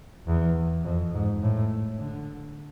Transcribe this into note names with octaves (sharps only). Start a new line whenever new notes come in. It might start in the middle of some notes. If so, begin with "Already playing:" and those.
E2
F2
G#2
A2
D3